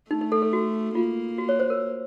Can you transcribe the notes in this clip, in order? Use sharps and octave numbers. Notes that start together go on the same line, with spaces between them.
A3 D#4
D#4
A4
A4
F#4
A#3 F4
F#4
C#5
C5
A#4